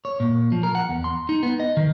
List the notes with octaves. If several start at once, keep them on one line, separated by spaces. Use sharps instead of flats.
C#5
A#2
F3
A#4
F#5
E2
C6
D#4
B3
D#5
D#3